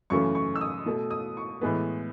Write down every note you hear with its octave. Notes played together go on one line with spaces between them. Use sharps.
F#2 C#3 E3 A3 C#6
C#6
E6
D#6
B2 A3
D#6
C#6
A2 E3 G#3 B3